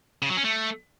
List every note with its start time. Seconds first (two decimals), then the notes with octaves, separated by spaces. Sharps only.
0.22 C#3
0.30 F#3
0.37 C#4
0.44 A3